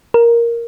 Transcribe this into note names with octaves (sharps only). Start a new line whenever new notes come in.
A#4